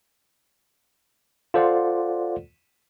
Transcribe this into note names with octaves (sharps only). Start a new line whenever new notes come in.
F4 A4 C5 D5 F#5